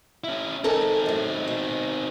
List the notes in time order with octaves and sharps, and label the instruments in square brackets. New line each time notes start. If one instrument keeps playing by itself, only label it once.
[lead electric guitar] C#4 E4
[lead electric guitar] C4 D#4 [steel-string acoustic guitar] A4 A#4 G#5
[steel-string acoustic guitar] F#2 A2
B2